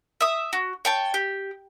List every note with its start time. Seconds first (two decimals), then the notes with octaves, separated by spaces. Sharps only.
0.21 E5 D#6
0.53 F#4
0.85 C#5 G5 A5
1.14 G4